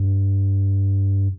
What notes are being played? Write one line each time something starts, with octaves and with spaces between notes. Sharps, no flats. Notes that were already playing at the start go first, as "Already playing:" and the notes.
Already playing: G2